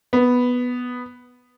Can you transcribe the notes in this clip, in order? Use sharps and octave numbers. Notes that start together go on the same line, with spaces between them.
B3